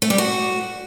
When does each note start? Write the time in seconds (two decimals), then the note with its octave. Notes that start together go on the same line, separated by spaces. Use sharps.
0.02 A3
0.10 G3
0.18 F#4